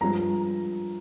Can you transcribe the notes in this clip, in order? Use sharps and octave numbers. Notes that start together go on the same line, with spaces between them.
G2 F3 G#3 A#5